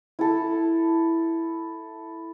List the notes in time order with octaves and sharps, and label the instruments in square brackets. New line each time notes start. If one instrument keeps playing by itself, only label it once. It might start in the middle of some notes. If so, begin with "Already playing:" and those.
[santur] E4 A4